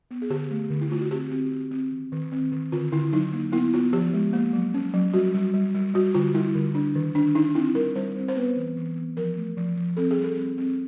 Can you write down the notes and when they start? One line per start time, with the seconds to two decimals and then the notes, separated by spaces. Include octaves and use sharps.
0.11 B3
0.22 G#4
0.30 D3 G4
0.51 A3
0.70 D3
0.81 E4
0.90 A3 F4
1.01 F#4
1.11 C4 G4
1.31 C4
1.51 C4
1.71 C4
1.92 D#3
2.12 D#3
2.32 C4
2.52 D#3
2.72 D3 F4
2.92 D3 E4
3.12 F#3 D#4
3.33 A#3
3.52 B3 E4
3.74 B3 F4
3.93 F3 G4
4.14 G#3
4.33 A#3
4.53 F#3
4.74 C#4
4.94 F#3
5.14 G3 F#4
5.35 G3
5.54 G3
5.75 G3
5.94 G3 F#4
6.14 D3 F4
6.34 G3 E4
6.55 D3
6.75 D4
6.95 D#3
7.15 D#3 D4
7.35 D4 D#4
7.55 C4 E4
7.75 G3 A#4
7.95 G3 C5
8.16 C4
8.28 C5
8.36 B3 B4
8.57 E3
8.77 E3
8.96 B3
9.17 F3 A#4
9.37 A3
9.57 F3
9.77 F3
9.97 C4 A4
10.11 G#4
10.17 G3
10.24 A4
10.37 C4
10.58 C4